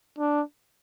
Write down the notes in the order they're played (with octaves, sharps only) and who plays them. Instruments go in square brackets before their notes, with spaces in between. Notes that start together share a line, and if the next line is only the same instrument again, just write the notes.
[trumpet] D4